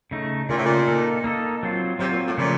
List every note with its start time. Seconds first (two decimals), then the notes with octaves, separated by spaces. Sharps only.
0.11 C#3 A3 D#4
0.49 A#2 C#3 A3 D#4
0.57 A2
0.64 A#2
0.88 A#3 D#4 A4
1.24 A#3 D#4 A4
1.63 F#3 C4 F4
1.99 C3 F#3 C4 F4
2.12 A#2
2.26 A2
2.37 A#2 C#3 F3 A3 C#4